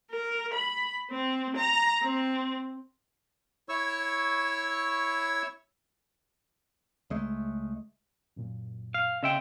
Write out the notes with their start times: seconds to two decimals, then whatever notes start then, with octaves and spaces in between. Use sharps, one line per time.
0.11 A#4
0.54 B5
1.11 C4
1.56 A#5
2.03 C4
3.69 E4 C#5 C#6 E6
7.10 C#2 G#3 A3
8.36 F#2 A#2
8.94 F5
9.23 C#3 D#5 E5 G5 C6